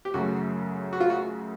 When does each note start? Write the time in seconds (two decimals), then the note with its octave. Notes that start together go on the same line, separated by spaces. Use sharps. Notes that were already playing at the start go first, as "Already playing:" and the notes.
0.05 G4
0.14 F#2 C#3 F#3 A3 F#4
0.93 F#4
1.00 F4
1.10 F#4